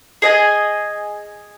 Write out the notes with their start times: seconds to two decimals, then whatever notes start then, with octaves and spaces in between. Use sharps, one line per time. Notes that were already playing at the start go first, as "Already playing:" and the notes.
0.22 G#4 D#5 G#5